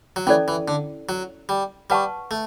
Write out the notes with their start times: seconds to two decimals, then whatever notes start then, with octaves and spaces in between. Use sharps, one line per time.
0.16 F#3
0.27 E3 C#4 E4 A4 D5
0.48 E3
0.68 D3
1.09 F#3
1.49 G3
1.90 G3 B4 F#5 A5 C#6
2.31 A3